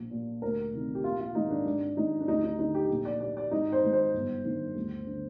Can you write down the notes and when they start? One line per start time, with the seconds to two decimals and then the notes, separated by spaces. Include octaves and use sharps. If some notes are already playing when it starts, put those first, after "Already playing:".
Already playing: A#1
0.11 A#2
0.42 D2 A#4
0.73 C3 D#3
0.95 G4
1.04 A#1 F4
1.20 F4
1.35 G#2 D#3 D#4
1.50 D4
1.66 G#1 D4
1.97 G#2 D#3 D#4
2.20 D4
2.28 D2 D#4
2.44 D#4
2.58 D3 D#4
2.74 G4
2.90 A#1
3.05 D5
3.20 A#2 D5
3.37 D5
3.51 G#1 D#4
3.72 C5
3.83 G#2 D#3
3.93 C5
4.14 G1
4.45 G2 D#3
4.75 D2
5.07 D3